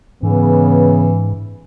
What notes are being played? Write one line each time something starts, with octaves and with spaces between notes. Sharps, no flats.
G#2 C#3 E3 B3